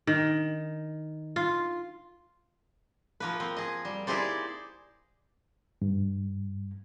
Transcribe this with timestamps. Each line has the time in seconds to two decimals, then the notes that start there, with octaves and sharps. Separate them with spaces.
0.07 D#3
1.36 F4
3.20 F3 A#3 B4
3.40 C4
3.56 G#4 D#5
3.85 G3
4.07 D#4 E4 G4 G#4 C5 D5
5.82 G2